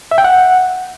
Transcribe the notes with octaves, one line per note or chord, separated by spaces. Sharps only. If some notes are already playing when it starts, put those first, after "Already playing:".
E5
G5
F#5